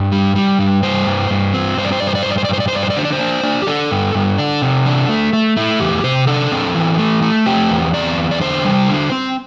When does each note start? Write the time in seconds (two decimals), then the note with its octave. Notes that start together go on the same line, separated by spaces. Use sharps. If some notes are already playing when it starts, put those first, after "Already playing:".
Already playing: G2 E4
0.12 G3
0.35 G3
0.59 G2
0.83 G3 C5
1.07 G2
1.30 G2
1.54 C4
1.77 G2 C5
1.85 D5
1.92 C5
2.00 G2 D5
2.07 C5
2.15 D5
2.23 G2 C5
2.31 D5
2.38 C5
2.45 D5
2.49 G2 C5
2.60 D5
2.68 C5
2.72 G2 D5
2.83 C5
2.90 D5
2.96 D3 C5
3.05 D5
3.13 C5
3.19 D4
3.44 D4
3.62 G4
3.67 D4 A4
3.91 G2
4.15 G2
4.38 D4
4.62 C3
4.86 D4
5.09 A3
5.33 A3
5.57 A3 E4
5.80 E2 G4
6.04 C3 C5
6.27 D4 A4
6.52 C4
6.75 E3
6.99 A3
7.23 A3
7.46 C4 G4
7.70 E2
7.93 C4 D5
8.17 E2
8.31 D5
8.41 D3 C5
8.64 G3
8.89 D3
9.12 C4